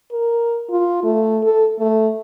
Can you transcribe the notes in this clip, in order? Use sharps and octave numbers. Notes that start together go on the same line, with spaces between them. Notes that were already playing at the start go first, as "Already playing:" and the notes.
A#4
F4
A3
A4
A3